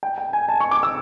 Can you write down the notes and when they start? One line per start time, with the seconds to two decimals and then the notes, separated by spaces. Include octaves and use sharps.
0.03 G5
0.18 G5
0.33 G#5
0.49 A5
0.60 C#6
0.71 D6
0.83 E6